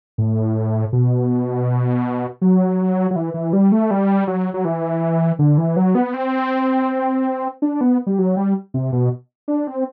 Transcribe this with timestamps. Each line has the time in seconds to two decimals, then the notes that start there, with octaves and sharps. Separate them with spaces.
0.18 A2
0.93 B2
2.42 F#3
3.11 F#3
3.16 E3
3.34 E3
3.53 G3
3.72 A3
3.91 G3
4.27 F#3
4.54 F#3
4.65 E3
5.39 D3
5.58 E3
5.76 F#3
5.95 B3
6.14 C4
7.62 D4
7.81 B3
8.07 G3
8.19 F#3
8.37 G3
8.74 C3
8.92 B2
9.48 D4
9.67 C4